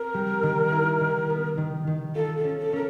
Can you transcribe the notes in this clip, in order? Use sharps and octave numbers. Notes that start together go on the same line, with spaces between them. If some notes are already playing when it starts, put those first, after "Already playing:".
Already playing: C4 A#4
G3
D#3
E4
D#3
B3
D#3
D#3
F4 A4
A4
C#4
A4
C#4 A#4